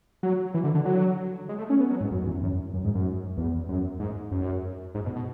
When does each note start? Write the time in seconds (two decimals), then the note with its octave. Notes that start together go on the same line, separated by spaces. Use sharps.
0.23 F#3
0.54 E3
0.64 D3
0.75 D3
0.85 F#3
1.49 G#3
1.58 A3
1.70 C#4
1.80 B3
1.90 F#3
2.01 G#2
2.12 F#2
2.27 E2
2.43 F#2
2.74 F#2
2.84 G#2
2.95 F#2
3.37 E2
3.69 F#2
4.00 G#2
4.31 F#2
4.95 G#2
5.06 B2
5.16 B2